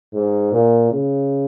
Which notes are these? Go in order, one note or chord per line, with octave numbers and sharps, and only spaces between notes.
G#2
A#2
C#3